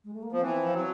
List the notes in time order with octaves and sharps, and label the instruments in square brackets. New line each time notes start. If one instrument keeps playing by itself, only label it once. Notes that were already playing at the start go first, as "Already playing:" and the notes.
[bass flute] G#3
A3
A#3
[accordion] F3 [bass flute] B3
[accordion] E3 [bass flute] C4
[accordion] F3
F#3